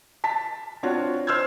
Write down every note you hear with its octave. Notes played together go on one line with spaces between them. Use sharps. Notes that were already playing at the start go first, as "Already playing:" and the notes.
A5 B6
C4 D4 F4 F#4 C#5
C5 C6 E6 F6 G6 G#6